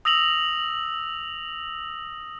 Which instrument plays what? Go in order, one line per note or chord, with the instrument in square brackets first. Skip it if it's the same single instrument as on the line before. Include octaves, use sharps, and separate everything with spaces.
[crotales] D#6 E6 A#6 F7 F#7